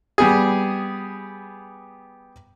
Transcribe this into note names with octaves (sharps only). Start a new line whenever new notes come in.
G3 B3 G#4